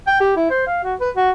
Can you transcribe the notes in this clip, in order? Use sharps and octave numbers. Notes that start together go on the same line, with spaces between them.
G5
G4
E4
C5
F5
F#4
B4
F#4